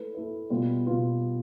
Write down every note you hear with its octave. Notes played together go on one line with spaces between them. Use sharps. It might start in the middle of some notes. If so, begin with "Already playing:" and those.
Already playing: A3 E4 B4
A3 E4 B4
B2 G3 B3 F4 B4
B2 G3 B3 F4 B4